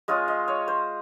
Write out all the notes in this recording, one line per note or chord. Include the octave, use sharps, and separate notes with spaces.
G#3 C#4 F4 D#5
D#5
C#5
C5